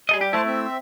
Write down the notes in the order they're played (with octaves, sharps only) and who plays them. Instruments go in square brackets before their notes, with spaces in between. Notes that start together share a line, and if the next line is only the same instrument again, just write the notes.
[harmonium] G3 [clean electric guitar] G#4 A4 D#5
[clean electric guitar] G4
[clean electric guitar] A3 E4 [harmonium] C5 A5
[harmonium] C4 E5